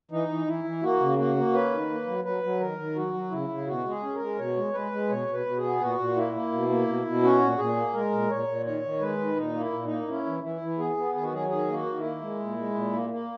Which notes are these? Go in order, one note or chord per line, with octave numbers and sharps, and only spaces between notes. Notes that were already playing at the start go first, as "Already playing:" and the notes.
E3 D#4
E3
E3 E4
E3
A#3 F#4
C#3
A#3 F#4
A#3
C#4 B4
D#3
A#3
F#3
F#3 B4
F#3
D#3 A#4
D#3
F#3 F#4
F#3
C#3 E4
C#3
B2 F#4
G#3
G#4
C#4
A#4
G#3
B2 C#5
G#3
G#3 B4
G#3
B2 C#5
B2 B4
B2
G#4
B3
A#2 F#4
A#2
A#3 E4
A#3
B2
A#3
B2
B2
C#4 F#4
A#2
A#2 G#4
A#3
G#3 A#4
A#2
A#2 C#5
A#2
D#3 C#5
D#3
G#3 B4
D#3
A#2 D#4
A#3
E4
A#2
D#4
A#3
C#4 E4
E3
E3 E4
E3
B3 G#4
B3
D#3 G#4
F#4
F#3 G#4
D#3 G#4
A#3
F#4
D#3
E4
A#3
G#3
A#2
G#3
A#2
A#3
A#3